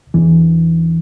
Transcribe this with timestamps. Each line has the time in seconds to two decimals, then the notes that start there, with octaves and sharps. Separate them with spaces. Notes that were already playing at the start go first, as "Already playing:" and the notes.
0.14 E2 E3